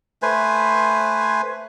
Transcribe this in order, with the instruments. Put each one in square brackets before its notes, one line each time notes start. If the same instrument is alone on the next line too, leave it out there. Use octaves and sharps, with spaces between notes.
[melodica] A3 B4 C5 G#5